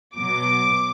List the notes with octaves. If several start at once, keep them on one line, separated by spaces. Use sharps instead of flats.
B2 F#3 D6